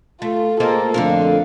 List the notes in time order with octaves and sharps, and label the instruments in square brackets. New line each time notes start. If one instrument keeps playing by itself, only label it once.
[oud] A3 [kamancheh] F4
[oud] A#3 C4 F4 [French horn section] G#4 D#5 [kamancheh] A4 A#5
[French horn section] F2 A3 D4 [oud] D3 F4 A#4 [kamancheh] F5